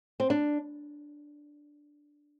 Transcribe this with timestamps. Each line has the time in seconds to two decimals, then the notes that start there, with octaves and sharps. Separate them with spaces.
0.20 C4
0.30 D4